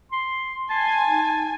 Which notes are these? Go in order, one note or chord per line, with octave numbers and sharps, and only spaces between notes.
C6
G#5 A5 C6
D#4